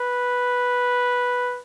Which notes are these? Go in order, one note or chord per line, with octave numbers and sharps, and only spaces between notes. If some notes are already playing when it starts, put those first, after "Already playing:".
Already playing: B4